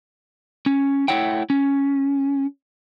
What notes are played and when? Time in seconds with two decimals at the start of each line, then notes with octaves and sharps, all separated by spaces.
0.66 C#4
1.08 A3 E4 C#5 F#5 G5
1.50 C#4